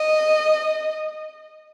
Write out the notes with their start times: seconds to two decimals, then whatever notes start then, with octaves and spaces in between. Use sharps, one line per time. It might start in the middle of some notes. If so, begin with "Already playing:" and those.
Already playing: D#5